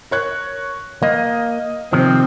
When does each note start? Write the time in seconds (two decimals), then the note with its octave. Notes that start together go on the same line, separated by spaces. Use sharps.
0.11 A#4 C#5 F#6
1.02 A#3 D#5
1.93 C3 D#3 F3 C4